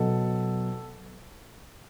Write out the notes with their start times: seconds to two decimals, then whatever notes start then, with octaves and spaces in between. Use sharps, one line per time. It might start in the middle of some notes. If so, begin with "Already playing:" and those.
Already playing: B2 F#3 A4